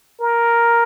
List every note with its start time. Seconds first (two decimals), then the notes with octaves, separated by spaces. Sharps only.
0.20 A#4